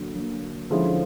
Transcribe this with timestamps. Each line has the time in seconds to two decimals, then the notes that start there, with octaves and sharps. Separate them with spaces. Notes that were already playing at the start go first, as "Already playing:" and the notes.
Already playing: D3 F#3 A#3
0.14 D3 F#3 A#3
0.70 D3 F3 G#3 C#4 E4